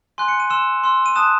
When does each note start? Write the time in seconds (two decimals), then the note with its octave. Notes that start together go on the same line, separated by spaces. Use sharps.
0.18 G#5 C6 F#6
0.28 C#7
0.40 D#7
0.50 C6 E6 E7
0.84 C6 E6
1.06 D#7
1.16 A5 D#6 F#6 E7